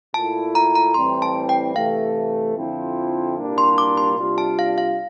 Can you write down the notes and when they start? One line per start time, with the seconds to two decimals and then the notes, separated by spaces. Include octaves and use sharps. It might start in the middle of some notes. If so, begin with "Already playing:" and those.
0.14 A#2 A3 E4 A5
0.55 A#5
0.75 A#5
0.94 A2 E3 G3 C4 C6
1.22 A5
1.49 G5
1.75 C3 E3 A3 F5
2.56 F2 D3 F3 C4 E4
3.38 C2 A#2 G3 A#3 D4
3.58 C6
3.78 D6
3.97 C6
4.18 C3 G3 D4 F4
4.38 A5
4.59 F5
4.78 F5